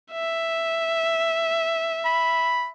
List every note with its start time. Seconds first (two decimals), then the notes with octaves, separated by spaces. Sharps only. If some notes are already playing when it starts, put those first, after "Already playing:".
0.12 E5
2.05 B5